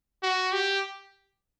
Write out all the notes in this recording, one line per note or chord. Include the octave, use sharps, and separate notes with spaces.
F#4
G4